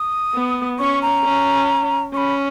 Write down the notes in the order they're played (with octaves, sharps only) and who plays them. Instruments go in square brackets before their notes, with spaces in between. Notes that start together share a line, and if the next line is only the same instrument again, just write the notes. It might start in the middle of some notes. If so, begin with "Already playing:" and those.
Already playing: [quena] D#6
[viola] B3
[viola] C#4 [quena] C#6
[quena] A#5
[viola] C#4
[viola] C#4 [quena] B5 C#6